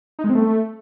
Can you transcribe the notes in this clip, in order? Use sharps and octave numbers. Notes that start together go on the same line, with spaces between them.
D#4
G#3
C4
A3